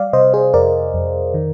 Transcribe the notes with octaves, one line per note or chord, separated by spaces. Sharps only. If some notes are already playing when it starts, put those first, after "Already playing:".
Already playing: G3 D5 F5
C3 C5 D#5
G#4 C5
F2 A#4 D5
F2
D#3